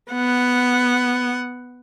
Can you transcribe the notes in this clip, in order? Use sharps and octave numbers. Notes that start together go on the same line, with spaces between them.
B3 F#5